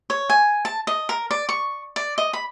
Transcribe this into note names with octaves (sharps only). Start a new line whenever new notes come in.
C#5
G#5
A5
D#5
A#4
D5
C#6
D5
D#5
B5